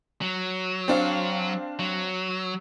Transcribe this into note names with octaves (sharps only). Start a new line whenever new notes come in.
F#3
C4 D4 F5
F#3